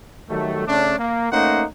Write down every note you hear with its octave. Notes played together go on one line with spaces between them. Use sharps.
D#3 F#3 G3 A3
C#3 A3 C#4 D4
A#3
A3 A#3 C#4 D#4 C5 F#5